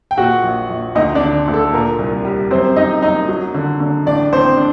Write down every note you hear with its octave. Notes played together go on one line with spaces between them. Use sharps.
G5
A#2 F#4 F#5
A#1
A#1
D2 D#4 D#5
D4 D5
D3
D2
A4
A#2 A#4
C2
G3
F#2 C4 C5
F#2 D#4 D#5
F#2 D#4 D#5
F#3
D3
D3
A1 D4 D5
A1 C4 C5
D4